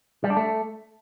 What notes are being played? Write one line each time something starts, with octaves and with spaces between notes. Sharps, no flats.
G3
D4
A3